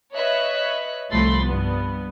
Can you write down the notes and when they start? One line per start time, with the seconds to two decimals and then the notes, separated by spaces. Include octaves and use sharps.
0.13 B4 C#5 D#5 E5 F#6
1.11 C2 F3 A3 B5 C6 A6
1.43 G2 B3